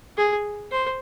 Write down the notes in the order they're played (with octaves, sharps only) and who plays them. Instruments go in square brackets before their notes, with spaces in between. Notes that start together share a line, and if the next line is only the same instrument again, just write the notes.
[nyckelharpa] G#4
C5